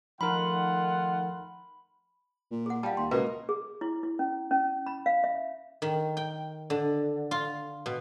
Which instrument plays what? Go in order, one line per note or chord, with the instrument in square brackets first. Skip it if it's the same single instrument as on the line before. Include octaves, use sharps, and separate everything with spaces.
[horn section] D#3 A3 F#5 [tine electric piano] F3 D#4 A#4 [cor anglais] F4 [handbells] B5
[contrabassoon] A#2
[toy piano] G#4 F#5
[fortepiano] G3 [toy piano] F5 A5
[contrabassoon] D#2 [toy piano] C6
[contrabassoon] C#2 [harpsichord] B2 [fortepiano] A#3 F#4 D#5
[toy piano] G#4
E4
E4
C#4
C#4
B5
F5
E5
[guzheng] D#3
G5
D3
F4
B2